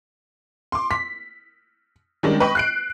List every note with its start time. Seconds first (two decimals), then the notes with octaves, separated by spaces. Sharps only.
0.72 C6 D6
0.91 B6
2.23 D#3 G3 G#3 C#4 D4
2.40 B4 D#5 G5 C#6
2.55 F#6 C7 D7